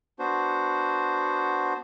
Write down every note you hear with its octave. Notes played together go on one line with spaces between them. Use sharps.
B3 D4 F#4 C5